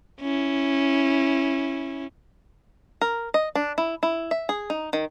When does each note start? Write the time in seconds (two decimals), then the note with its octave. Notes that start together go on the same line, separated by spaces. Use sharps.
0.21 C#4 E4
3.01 A#4
3.34 D#5
3.55 D4
3.78 E4
4.03 E4
4.31 E5
4.49 G#4
4.70 D#4
4.93 D#3